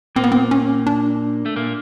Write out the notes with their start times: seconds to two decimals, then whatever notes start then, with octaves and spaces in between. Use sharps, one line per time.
0.16 A#2 A#3 C4
0.24 B3
0.32 C4
0.51 C#4
0.87 D4
1.46 A3
1.56 A#2 A#3